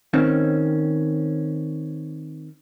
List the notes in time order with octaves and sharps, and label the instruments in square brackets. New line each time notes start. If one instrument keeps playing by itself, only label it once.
[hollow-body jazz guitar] D#3 C4 C#4